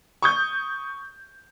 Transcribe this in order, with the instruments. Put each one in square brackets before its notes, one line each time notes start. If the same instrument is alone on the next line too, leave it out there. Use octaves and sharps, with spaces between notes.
[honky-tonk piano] C#6 D#6 G6